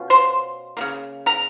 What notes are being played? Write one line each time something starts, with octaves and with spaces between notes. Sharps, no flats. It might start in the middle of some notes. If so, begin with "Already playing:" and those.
Already playing: B2 C#4 F4
C5 C6
C#3 F3 A#3
A#4 A#5